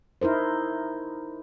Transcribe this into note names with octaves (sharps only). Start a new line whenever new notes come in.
D#4 E4 A#4 C5